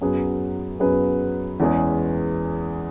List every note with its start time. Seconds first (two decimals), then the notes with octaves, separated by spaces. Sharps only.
0.01 F#2 F#3 B3 G#4 B4
0.80 F#2 F#3 B3 G#4 B4
1.60 E2 E3 G#3 C#4 G#4